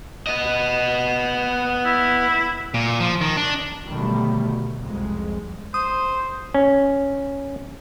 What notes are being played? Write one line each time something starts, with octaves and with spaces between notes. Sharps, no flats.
B3 D#5
E4
A#2
F3
D#3
D4
B2 D3 D#3 F#3 G3 A3
C2 F2 G#3
C5 D#6
C#4